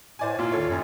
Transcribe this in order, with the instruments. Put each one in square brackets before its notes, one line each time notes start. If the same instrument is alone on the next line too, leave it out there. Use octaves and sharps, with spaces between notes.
[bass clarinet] A2 [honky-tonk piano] C5 D5 G#5
[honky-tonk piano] A#2 [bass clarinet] F4
[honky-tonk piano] D#2 A4 C#5
[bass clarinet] F#2